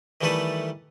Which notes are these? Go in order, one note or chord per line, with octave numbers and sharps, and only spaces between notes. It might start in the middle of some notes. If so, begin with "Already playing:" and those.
D#3 E3 G3 A3 A4 B4